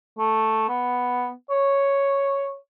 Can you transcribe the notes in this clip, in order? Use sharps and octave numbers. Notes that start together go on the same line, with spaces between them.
A3
B3
C#5